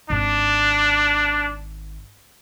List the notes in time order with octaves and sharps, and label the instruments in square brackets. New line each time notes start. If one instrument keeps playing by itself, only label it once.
[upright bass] G#1 [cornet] D4